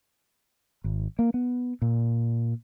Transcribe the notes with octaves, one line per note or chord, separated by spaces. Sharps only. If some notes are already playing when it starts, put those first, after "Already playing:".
G#1
A#3
B3
A#2